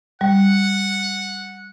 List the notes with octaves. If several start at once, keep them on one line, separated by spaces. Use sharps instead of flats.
G3 F#5